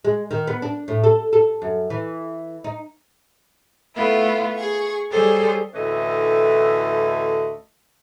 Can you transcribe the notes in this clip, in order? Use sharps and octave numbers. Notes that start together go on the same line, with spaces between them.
G#3
D#3
B3
D4
A2
A4
A4
F#2
E3
D#4
A3 B3 E4 F4
G#4 C#6
G3 G#4 A4 C5 C#5
D2 A2 E3 A3 C#4 D#5